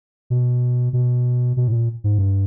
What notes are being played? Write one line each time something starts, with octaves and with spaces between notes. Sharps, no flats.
B2
B2
B2
A2
A#2
G#2
G2